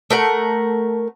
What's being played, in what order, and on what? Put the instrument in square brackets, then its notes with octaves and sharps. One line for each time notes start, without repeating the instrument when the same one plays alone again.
[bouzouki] A3 A#4 F#5